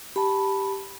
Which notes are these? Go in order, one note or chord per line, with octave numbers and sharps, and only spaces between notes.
G4 A5 B5